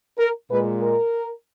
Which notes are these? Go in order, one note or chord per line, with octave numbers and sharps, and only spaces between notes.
A#4
A#2 G#3 B4
A#4